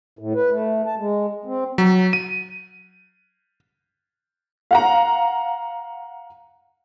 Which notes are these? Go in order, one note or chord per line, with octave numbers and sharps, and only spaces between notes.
A2
B4
A3
A5
G#3
C4
F#3
D#7
F5 F#5 A#5